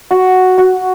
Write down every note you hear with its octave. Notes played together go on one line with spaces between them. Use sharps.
F#4
F#4